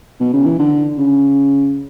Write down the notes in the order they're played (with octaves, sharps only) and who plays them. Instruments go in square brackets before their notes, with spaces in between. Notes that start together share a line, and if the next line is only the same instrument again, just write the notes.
[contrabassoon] B2
C#3
E3
D3
C#3